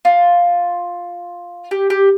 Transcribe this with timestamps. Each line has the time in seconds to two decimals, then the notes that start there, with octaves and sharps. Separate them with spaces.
0.05 F4
1.71 G4
1.90 G4